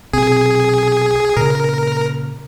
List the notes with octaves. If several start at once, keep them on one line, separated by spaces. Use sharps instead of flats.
B1 C3 C4 G#4
A#2 C#3 A#4